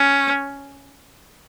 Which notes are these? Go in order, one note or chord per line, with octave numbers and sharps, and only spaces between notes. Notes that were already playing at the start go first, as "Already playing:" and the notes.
Already playing: C#4